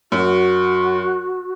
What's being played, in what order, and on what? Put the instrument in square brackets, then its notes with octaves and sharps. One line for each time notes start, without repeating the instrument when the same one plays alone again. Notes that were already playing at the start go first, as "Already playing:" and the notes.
[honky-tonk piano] F#2 [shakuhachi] F#4